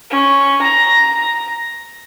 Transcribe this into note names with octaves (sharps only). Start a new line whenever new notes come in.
C#4
A#5